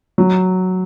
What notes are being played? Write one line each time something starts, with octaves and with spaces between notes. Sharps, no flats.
F#3